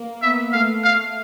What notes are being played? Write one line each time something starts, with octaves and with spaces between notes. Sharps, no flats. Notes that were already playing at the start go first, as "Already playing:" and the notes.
Already playing: A#3
B3 E5
A3 F5
F5